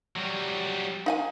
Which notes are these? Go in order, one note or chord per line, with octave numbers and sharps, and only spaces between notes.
F#3 G3
D#4 F#5 G#5